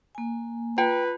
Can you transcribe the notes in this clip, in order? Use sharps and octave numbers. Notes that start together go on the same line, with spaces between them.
A#3 G#5
F4 B4 G5